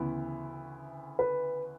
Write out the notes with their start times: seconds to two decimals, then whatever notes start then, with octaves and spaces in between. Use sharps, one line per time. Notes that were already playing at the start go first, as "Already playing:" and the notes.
Already playing: D2 C#3 E3 B3 E4
1.19 B4